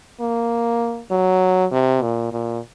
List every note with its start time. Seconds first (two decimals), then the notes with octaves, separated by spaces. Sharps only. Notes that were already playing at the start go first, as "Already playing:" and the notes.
0.21 A#3
1.11 F#3
1.72 C3
2.02 A#2
2.32 A#2